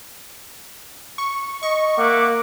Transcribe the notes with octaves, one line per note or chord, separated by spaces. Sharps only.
C#6
D#5 C#6
A#3 E5 F#5 D6